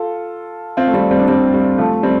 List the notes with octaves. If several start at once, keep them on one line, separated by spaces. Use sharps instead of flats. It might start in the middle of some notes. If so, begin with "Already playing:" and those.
Already playing: F4 A4
C4 F4
A3
G3 C4
G3 C4
D4
G3 C4
G3
F3 A3
G3 C4